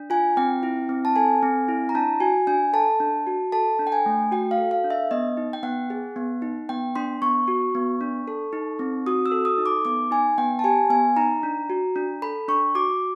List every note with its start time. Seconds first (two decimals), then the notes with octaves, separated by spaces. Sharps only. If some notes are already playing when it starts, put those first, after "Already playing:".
Already playing: D4
0.10 F4 G#5
0.37 C4 G5
0.63 E4
0.89 C4
1.05 A5
1.16 A4 G#5
1.43 C4
1.68 E4
1.89 A#5
1.95 D4 A5
2.20 F#4 G#5
2.47 D4 G#5
2.73 A4 A5
3.00 D4
3.27 F#4
3.52 A4 A5
3.79 D4
3.87 G5
3.92 G#5
4.06 A3
4.32 F#4 G5
4.51 F5
4.58 A4
4.71 F5
4.84 D4
4.90 E5
5.11 B3 D#5
5.37 D#4
5.53 G5
5.63 B3 F#5
5.90 G#4
6.16 B3
6.42 D#4
6.69 B3 G5
6.95 D4 C6
7.22 B3 C#6
7.48 F#4
7.75 B3
8.01 D4
8.28 A4
8.53 D#4
8.79 C4
9.06 F#4 D#6
9.26 E6
9.32 A4
9.45 D#6
9.58 D#4
9.66 D6
9.85 B3 D6
10.11 D#4 G#5
10.38 B3 G5
10.59 A5
10.64 G4 G#5
10.90 B3 G#5
11.17 D#4 A#5
11.43 D4
11.70 F#4
11.96 D4
12.22 A4 B5
12.48 D4 C#6
12.75 F#4 D6